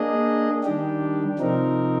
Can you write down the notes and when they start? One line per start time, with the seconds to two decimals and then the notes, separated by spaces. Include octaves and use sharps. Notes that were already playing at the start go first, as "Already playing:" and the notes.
Already playing: A#3 D4 G#4 D#5
0.64 D#3 G3 D4 G4
1.39 C3 F3 C4 D#4 A#4